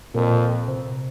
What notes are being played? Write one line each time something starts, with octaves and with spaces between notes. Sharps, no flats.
F2 A#2
C3